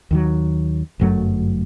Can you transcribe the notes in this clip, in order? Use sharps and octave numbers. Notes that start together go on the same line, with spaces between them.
D#2 D#3 F#3
G1 F#2 F#3 A3